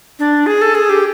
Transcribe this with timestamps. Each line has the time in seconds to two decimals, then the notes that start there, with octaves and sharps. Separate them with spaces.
0.19 D4
0.46 G#4
0.62 A4
0.75 G#4
0.90 G4